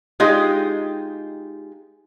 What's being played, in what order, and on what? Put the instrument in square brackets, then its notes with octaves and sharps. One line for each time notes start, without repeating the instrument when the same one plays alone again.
[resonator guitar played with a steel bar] G#3 D#4 F4 G4